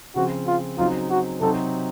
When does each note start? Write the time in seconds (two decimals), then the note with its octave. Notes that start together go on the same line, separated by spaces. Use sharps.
0.16 C#3 F3 C4 F#4
0.47 F4
0.78 C#3 F#3 C4 D#4 F4
1.10 F#4
1.41 C3 F#3 C4 D#4 F#4 A4